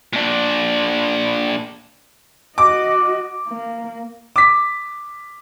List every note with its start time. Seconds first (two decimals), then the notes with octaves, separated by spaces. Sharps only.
0.13 A#2 D4
2.58 F#4 D#5 D6
3.49 A#3
4.36 D6 B6